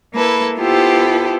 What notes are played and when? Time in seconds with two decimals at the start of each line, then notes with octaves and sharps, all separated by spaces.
0.15 A#3 E4 A4 B4
0.57 B3 E4 F4 G4 A4 C5